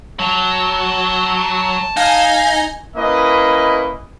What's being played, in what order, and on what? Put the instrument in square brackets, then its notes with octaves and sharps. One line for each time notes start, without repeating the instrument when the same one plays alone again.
[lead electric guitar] F#3 [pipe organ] A5
[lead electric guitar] D#4 [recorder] F5 [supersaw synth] G#5
[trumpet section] A#3 C#4 E4 B4 D#5